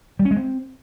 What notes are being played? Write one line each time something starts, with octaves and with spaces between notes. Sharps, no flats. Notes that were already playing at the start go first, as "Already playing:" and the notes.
G3
C#4
G#3
C4